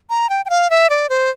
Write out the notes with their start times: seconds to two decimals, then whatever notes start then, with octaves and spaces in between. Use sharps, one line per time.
0.10 A#5
0.30 G5
0.45 G5
0.50 F5
0.70 E5
0.90 D5
1.09 C5